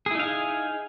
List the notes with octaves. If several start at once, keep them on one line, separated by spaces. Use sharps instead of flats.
D#4 E4 G#4 F5 G#5